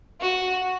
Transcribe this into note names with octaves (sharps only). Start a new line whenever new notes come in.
F#4